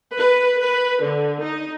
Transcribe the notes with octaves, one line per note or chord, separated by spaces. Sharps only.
B4
B4
D3
D#4